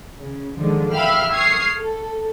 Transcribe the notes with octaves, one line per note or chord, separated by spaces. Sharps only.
C#3
D3 D#3 F3 G#3
E5 F5 G5 B5 F6
C#6 D#6 F6 G#6 C7
A4